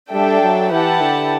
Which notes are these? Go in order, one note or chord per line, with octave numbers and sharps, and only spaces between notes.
G3 D4 A4 E5 G5
F#3
E3 E4 G4 B4 F#5 A5
D3